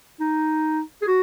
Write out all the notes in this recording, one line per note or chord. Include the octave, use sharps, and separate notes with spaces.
D#4
G#4
F#4